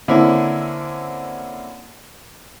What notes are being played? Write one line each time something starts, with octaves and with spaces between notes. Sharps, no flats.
D3 A#3 C4 C#4 E4